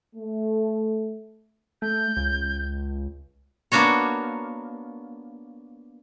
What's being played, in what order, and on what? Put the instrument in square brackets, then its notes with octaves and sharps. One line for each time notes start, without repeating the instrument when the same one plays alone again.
[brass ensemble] A3
[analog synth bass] A3 [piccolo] G6
[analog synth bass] C#2
[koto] A#3 B3 D4 F#4 C#5